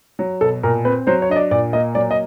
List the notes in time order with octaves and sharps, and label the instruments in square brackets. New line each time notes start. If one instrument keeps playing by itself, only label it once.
[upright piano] F#3
[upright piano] B2 [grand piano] A4
[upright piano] A#2 [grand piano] A#4
[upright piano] C4 [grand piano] B4
[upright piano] F#3 [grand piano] C5
[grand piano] C#5
[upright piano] D4 [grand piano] D#5
[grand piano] D5
[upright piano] A#2 [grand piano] D5
[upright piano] A#3 [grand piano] D#5
[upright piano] F#3 [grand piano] D5
[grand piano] D#5